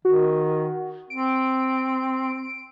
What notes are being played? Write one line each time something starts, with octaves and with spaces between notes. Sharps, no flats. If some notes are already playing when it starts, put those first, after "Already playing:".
D#3 F#4
C4 D7